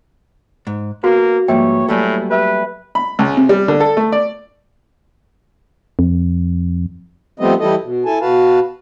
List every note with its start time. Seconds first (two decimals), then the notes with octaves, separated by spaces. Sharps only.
0.67 G#2
1.04 A#3 B3 F#4
1.48 G#2 F3 G3 A#3 B4 C#5 E5 G5
1.88 A2 F#3 G3 A3 A4 G#5
2.31 G4 B4 E5 F6
2.95 B5
3.19 C#2
3.37 C3
3.49 G3
3.68 D3
3.80 A4
3.97 A3
4.12 D5
5.99 F2
7.39 F3 G3 A3 B3 C4 D#5
7.60 E3 G3 E4 A4 D#5
7.83 B2
8.05 E4 A4 G#5 A5
8.21 B2 F#4 B4 F5 A5